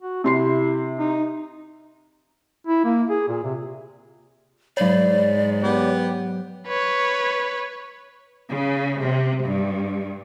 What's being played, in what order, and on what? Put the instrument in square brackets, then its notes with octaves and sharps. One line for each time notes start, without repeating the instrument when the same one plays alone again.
[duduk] F#4
[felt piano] C3 C6 C7 [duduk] E4
[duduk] D#4
E4
A#3
G#4
A#2
C3
[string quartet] G#2 [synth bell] F#3 C#5 [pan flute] D5
[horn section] B3 G4
[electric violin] B4 C#5
[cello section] C#3
C3
G2